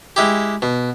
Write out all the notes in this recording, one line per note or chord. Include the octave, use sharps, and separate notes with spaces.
G#3 E4 G4
B2